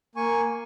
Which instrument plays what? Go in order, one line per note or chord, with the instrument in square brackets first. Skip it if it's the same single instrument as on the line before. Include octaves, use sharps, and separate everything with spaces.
[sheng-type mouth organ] A#3 G#5 C#6